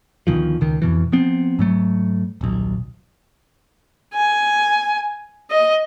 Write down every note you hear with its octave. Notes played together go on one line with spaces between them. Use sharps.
D2 B2 D#3 F3
C#2 D#3
F2 B2 E3
F3 B3 C4
G#2 F#3 A3
D#1 B1
G#5
D#5